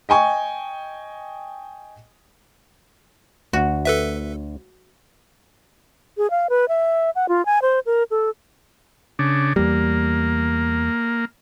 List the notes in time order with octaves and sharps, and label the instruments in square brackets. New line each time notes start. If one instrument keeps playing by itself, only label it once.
[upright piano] D#5 G5 G#5 C#6
[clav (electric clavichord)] D2 [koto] F#4
[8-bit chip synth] A4 B4 E5
[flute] G#4
F5
B4
E5
F#5
F4
G#5
C5
A#4
A4
[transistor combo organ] C#3 D4
[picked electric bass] E2 G3 [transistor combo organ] A#3